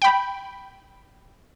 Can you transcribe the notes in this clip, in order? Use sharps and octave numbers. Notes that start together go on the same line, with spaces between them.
G5 B5